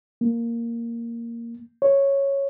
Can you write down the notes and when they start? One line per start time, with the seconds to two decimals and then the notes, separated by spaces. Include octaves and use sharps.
0.21 A#3
1.82 C#5